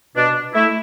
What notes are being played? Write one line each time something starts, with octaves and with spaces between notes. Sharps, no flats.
B2 D4
A3 E4